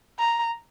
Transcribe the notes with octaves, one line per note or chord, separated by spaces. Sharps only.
A#5